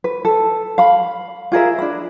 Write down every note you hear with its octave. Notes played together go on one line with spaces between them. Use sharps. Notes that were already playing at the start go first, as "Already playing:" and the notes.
B4
A4
F5 B5
F4 G#4 A#4 E5
D4 B5